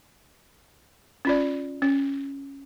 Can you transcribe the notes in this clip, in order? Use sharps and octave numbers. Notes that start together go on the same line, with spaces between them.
C#4 F4 D5
C#4